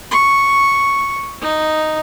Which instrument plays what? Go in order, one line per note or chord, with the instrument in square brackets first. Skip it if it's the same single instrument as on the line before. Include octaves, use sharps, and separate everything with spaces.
[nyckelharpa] C#6
D#4